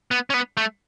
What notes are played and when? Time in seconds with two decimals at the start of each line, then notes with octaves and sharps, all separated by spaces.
0.11 B3
0.30 C#4
0.34 B3
0.57 A3